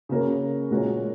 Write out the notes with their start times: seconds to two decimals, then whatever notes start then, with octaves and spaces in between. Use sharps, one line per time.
0.09 C#3 A#3 F#4 A#4 C#5
0.71 A#2 G#3 F#4 A#4 C#5